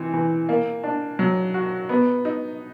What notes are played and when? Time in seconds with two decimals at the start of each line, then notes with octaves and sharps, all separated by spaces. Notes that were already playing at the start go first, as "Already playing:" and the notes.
Already playing: E3 C4
0.13 E3
0.49 A#3
0.84 D4
1.19 F#3
1.54 F#4
1.89 B3
2.25 D#4